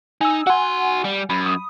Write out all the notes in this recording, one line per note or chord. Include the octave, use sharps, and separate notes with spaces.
D#4 G#5 E6
F#4 F#5 G#5 C6
G3
F#2 B5
D#6